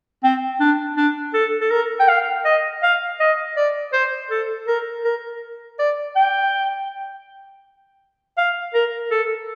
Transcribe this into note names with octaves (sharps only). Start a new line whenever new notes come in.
C4
D4
D4
A4
A4
A#4
G5
F5
D#5
F5
D#5
D5
C5
A4
A#4
A#4
D5
G5
F5
A#4
A4